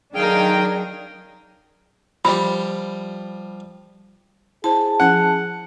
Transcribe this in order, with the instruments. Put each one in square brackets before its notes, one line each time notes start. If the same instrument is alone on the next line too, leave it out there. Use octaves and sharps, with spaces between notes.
[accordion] D#3 G5 [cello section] F#3 D4 D#4 [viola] G#4 [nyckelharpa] A#4 F5
[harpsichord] F3 G3 [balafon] B5
[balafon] E4 C5 [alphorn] G#4 [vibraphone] A5
[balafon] F3 C#4 E4 [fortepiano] F#5